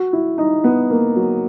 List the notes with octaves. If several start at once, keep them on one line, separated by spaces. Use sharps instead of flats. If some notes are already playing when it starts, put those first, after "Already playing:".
Already playing: F#4
E4
D#4
B3
A#3
F#3